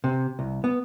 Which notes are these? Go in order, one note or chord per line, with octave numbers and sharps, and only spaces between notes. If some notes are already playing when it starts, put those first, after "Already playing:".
C3
C2
B3